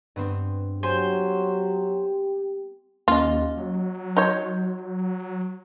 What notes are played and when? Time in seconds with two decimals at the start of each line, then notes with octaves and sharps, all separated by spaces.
0.16 G2 B3 C4
0.83 F#3 G4 C5 G#5
3.08 D#2 A#3 C#4 F4 D#5
3.57 F#3
4.17 D#4 C#5 C6 G6 G#6